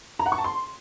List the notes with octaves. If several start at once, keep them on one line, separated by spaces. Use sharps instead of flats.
A#5
F#5
C#6
A5
C6